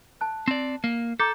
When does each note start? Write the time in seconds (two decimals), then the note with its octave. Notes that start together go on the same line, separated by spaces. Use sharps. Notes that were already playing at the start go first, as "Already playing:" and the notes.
0.21 A5 F#6
0.48 C4 D5
0.84 A#3
1.20 A4 A#5 D6 G6